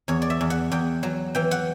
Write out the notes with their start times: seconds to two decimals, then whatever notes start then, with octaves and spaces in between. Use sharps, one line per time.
0.08 E2 C#5
0.22 D5
0.30 E5
0.41 E2
0.50 F#5
0.71 E2 G5
1.03 F#3
1.35 E3 G5
1.51 F#5